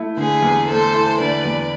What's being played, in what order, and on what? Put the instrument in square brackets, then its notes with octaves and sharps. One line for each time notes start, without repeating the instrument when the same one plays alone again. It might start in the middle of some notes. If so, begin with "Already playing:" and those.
Already playing: [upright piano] A3 E4
[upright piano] D3 [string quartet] G#4 B4
[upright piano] E2
[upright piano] A3 [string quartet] A4 C5
[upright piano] E4
[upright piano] D3 [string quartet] B4 D5
[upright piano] E2